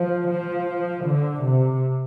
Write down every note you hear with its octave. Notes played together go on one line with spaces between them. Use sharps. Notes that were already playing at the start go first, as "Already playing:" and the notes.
Already playing: F3
F3
D3
C3